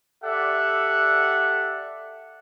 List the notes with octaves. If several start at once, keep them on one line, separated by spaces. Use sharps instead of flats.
G4 A4 D5 E5 F#5